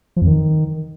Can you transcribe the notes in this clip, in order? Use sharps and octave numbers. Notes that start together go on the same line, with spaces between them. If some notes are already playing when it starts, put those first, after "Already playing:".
F3
F2
D#3